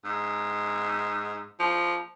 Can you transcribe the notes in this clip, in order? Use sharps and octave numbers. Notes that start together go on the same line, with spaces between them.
G#2
F3